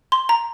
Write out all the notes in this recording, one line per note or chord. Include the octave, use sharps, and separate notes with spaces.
C6
A#5